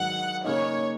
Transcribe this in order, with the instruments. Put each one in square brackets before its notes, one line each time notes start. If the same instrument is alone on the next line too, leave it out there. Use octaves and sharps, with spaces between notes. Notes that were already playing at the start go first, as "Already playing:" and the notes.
Already playing: [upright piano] G#2 D#3 F#3 D#4 F#4 [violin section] F#5
[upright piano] C#3 A#3 D#4 [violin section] C#5